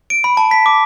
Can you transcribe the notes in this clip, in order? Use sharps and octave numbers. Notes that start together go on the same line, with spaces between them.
D7
B5
A5
B6
D6